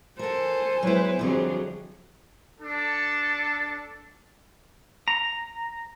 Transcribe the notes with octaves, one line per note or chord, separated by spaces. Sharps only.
A4 A#4 C5 F#5 G#5
F#3 G#3 B3 E4 B4
F2 D3 F#3 G3 G#4
D4 A4
A#5